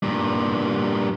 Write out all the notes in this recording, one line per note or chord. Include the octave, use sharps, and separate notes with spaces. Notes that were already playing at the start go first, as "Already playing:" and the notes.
G2 A#2